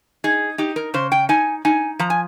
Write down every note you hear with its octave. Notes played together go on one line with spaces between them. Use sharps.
D#4 G#4
D#4 G4
A#4
C#3 C5
G5
D#4 G#5
D#4 G#5
F3 A#5
G#5